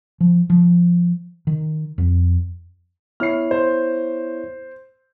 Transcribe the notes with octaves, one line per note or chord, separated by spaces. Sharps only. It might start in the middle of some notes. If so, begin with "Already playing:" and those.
F3
F3
D#3
F2
B3 E4 C#5 F6 C7
C5